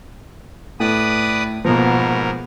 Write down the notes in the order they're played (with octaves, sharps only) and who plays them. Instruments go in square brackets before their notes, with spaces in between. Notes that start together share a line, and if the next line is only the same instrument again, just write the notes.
[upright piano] A2 [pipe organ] B4 D5 D#6
[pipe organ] G#2 A#4 [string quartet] B2 B3 [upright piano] F3 A#3